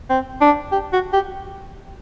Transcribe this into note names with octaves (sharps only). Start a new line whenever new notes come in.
C4
D4
G4
F#4
G4